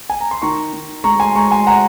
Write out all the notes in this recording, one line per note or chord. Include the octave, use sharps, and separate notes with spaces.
G#5
A#5
C6
D#3 A#5 C#6
D#3
G#3 A#5 C#6
G#5 C6
G#3 A#5 C#6
G#5 C6
F#5 A#5